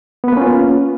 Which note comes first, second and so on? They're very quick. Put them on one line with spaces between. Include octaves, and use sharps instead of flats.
B3 B4 A#3 C#4 F4